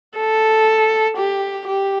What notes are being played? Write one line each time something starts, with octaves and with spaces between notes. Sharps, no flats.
A4
G4
G4